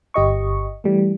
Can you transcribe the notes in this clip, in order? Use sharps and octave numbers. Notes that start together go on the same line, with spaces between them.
G1 G4 D#5 C#6
E3 G3 A3